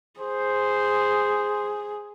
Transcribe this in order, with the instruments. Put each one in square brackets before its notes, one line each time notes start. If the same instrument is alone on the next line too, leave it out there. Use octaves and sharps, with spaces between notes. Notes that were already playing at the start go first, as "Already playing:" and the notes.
[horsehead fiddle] G#4 [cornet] C5